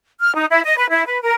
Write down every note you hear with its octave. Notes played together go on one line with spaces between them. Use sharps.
F6
D#4
E4
D#5
B4
E4
B4
A#4